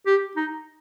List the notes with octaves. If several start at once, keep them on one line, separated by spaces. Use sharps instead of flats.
G4
D#4